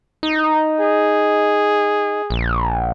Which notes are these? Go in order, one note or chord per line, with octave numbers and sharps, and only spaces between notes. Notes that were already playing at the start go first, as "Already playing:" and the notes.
D#4
G#4
A#1